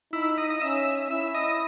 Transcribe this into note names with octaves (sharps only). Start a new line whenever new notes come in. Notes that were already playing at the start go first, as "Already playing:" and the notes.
D#4 E4
D#5
D#5
C#4 E5
E4 E5
D#5